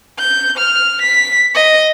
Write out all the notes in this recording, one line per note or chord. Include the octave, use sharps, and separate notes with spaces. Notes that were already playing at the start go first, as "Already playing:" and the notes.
G6
F6
B6
D#5